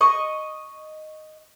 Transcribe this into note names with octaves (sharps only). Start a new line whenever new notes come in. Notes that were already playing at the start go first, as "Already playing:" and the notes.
D#5 C#6